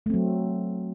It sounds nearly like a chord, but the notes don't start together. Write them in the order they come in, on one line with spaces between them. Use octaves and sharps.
A3 C4 F#3